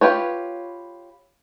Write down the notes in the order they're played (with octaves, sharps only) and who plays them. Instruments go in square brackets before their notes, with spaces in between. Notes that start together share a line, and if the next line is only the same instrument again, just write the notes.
[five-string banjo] F4 G4 B4 C#5